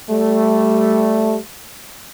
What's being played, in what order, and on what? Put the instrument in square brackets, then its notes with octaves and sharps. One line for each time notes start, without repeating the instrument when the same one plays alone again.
[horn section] G3 A3